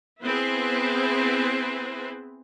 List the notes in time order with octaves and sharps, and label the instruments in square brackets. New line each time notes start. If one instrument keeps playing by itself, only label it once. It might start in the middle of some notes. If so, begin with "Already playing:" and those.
[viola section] B3 C4 E4 G#4 B4 C5